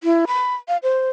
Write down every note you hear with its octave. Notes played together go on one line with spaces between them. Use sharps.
E4
B5
F5
C5